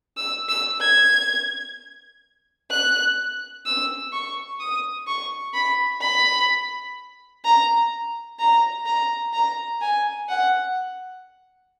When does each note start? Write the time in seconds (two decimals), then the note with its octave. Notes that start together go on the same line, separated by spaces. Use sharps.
0.17 E6
0.49 E6
0.80 G#6
2.71 F#6
3.66 E6
4.12 C#6
4.60 D#6
5.07 C#6
5.54 B5
6.01 B5
7.44 A#5
8.39 A#5
8.86 A#5
9.33 A#5
9.81 G#5
10.29 F#5